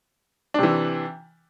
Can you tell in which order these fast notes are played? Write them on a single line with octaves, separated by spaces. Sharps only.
D4 C3 E3